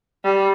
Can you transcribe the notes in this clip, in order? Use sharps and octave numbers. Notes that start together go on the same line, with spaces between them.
G3